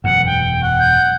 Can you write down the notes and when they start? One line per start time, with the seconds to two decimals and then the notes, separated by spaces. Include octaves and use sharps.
0.04 E1 F#2 F#5
0.26 G5
0.63 F#5
0.79 G6